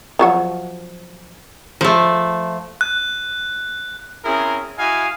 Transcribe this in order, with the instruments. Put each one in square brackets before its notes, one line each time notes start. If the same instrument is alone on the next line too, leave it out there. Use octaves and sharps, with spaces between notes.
[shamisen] F3 F#3 F#4
[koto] F3 A3
[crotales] F#6
[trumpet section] C4 C#4 E4 G#4 A#4
E4 F#4 D#5 F5 G#5